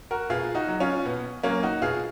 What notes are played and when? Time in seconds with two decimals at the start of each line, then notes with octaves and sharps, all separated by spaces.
0.11 F#4 A#4
0.30 B2 F4 G#4
0.55 D#4 F#4
0.68 F#3
0.80 C#4 F4
1.05 B2 B3
1.43 F#3 A#3 C#4
1.63 D#4 F#4
1.82 B2 F4 G#4